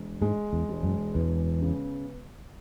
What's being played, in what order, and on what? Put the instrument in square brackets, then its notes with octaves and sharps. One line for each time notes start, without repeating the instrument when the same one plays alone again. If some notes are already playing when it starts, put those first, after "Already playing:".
Already playing: [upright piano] E1
[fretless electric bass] G#2 [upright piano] G#3
[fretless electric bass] E2
[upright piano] E1
[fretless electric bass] F#2
[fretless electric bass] E2 [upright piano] B3
[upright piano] C#3